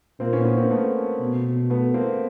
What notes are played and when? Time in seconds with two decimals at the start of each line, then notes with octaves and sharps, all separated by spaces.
0.20 A#2 A#3 C4
0.33 B3 C#4
0.45 B3 C#4
0.57 A#3 C4
0.71 A3 B3
1.20 B2
1.70 A3 B3
1.94 A#3 C4